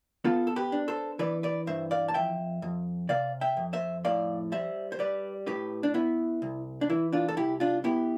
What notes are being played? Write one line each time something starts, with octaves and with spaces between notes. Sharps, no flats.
B3 F4 A4
A4
G4 B4
D4
A4 C5
E3 B4 D5
B4 D5
G2 C5 E5
D5 F5
A5
F2 E5 G5
F2
C3 D5 F5
E5 G5
F2
C5 E5
A2 D5 F5
G3 C5 E5
C5
G3 B4 D5
A2 G4 B4
D4
B3 E4
C2
D4
E3 E4
D4 F4
A4
C2 E4 G4
D4 F4
B3 E4 G4